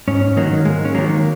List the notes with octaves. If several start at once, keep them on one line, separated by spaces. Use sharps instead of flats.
G#2 C#4
D#3 F#3 A#3
G#2 G#3
C#4
D#3 F#3 A#3